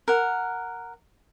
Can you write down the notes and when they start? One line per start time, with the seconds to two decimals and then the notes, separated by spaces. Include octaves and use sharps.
0.08 A#4 F#5